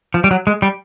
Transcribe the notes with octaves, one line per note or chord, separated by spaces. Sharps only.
F3
G3
F#3
G#3
G3